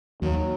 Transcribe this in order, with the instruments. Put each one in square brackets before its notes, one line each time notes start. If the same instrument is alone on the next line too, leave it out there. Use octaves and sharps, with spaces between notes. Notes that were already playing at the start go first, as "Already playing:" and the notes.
[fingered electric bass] D#2 [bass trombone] F#3